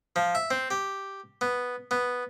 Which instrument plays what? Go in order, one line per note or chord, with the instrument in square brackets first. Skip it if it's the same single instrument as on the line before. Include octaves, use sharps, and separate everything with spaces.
[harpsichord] F3
E5
C4
G4
B3
B3